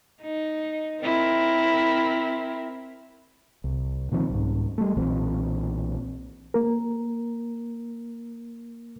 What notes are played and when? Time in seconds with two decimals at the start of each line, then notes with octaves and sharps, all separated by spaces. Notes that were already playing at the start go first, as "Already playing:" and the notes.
0.22 D#4
1.02 C4 E4 A#4
3.64 C2
4.12 A#2 D#3 F3 C4
4.30 C2 G#2
4.78 G3 A3
4.97 B1 A#2 E3 C4
6.54 A#3 A#4